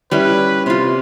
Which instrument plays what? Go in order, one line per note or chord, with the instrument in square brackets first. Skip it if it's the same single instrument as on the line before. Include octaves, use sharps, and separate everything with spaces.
[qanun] G3 C#4 E4 [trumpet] B4
[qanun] C3 F4 [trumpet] C6